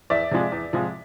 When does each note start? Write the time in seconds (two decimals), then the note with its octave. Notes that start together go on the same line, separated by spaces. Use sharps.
0.10 E2 D5 E5
0.31 C3 F3 G#3
0.52 E2
0.73 C3 F3 G#3